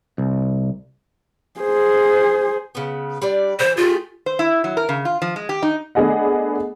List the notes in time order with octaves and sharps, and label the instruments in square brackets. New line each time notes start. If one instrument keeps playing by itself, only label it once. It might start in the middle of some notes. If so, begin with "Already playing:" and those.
[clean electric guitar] C2
[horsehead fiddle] G#4 C5
[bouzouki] C#3 B3
G3 D4 D5
[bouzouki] C#3 E3 [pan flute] C5
[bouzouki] A3 G4 G#4 [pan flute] F4
[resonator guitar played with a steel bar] C5
E4
F#3
A#4
C#3
F4
F3
G#3
G4
D#4
[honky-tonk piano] A3 B3 D4 G#4 D#5 F#5